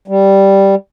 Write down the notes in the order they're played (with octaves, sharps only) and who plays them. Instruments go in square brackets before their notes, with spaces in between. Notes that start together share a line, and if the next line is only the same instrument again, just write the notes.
[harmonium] G3